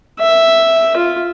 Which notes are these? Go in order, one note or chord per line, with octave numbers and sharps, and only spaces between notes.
E5
F4